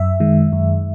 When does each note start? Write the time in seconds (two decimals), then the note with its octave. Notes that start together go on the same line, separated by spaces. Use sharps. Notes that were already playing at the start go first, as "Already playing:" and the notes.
Already playing: F#2 E5
0.20 D#3 G#3
0.53 F#2